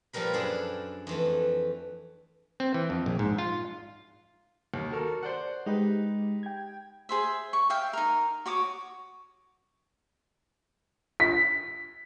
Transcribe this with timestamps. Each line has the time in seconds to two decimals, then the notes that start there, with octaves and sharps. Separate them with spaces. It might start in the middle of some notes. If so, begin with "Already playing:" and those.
0.13 A#2 F3 G3 A#4 B4
0.33 F#2 D4 G#4 A4 D5
1.07 F2 E3 A3
2.60 C4
2.74 E3
2.90 F2
3.06 A#1
3.19 G#2
3.38 F4
4.74 D#2
4.91 F#4 A4 A#4
5.23 C5 D5 F#5
5.66 G#3 D#4 G4 B4
6.43 G5 G#6
7.09 G#4 C5 E5
7.53 C#6
7.70 E5 F5 G5
7.93 D#4 A#4
8.46 F#4 C#5 D6 D#6
11.20 B6